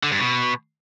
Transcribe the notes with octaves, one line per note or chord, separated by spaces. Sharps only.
D3
G2
B2